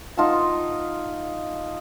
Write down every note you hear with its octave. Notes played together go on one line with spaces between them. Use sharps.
D#4 F4 F#5 A5